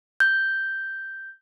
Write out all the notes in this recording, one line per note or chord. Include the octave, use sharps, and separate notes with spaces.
G6